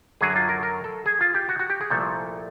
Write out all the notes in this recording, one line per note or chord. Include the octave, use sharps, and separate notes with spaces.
F#2 D3 F#3 G#4
F4
A#4
A#4
A4
G#4
F4
G4
F#4
F#4
G4
G#4
C2 A#2 F3 A3 A4